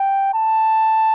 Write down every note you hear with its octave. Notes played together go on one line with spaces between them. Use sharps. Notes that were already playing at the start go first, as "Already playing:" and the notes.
Already playing: G5
A5